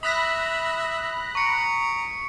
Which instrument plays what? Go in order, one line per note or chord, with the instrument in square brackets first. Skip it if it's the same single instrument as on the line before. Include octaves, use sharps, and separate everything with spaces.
[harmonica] E5 [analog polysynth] B5 F#6 A#6 [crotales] D#6 B6
[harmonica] A#5 [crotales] C#6 C#7 D7